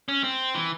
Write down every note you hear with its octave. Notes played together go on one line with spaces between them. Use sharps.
C#4
C4
E3